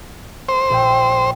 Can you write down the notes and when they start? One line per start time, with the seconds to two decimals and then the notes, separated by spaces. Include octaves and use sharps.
0.49 C5
0.70 A#1 E5 G5